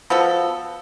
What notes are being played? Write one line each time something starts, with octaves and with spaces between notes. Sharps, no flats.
F3 B3 F#4 A4